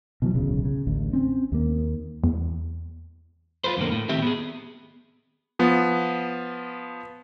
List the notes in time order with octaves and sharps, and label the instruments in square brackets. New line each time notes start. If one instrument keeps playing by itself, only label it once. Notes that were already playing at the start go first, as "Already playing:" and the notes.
[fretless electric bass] B2 E3 F#3
D1 B1 C#3
C#3
A1 D2
C4 C#4
D#2 A#3
[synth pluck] E2
[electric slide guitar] F4 A4 B4 C5
F2 A2 D3 A#3
A2
D#3 C4 G4 E5
B3 G4 G#4
[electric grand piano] F3 B3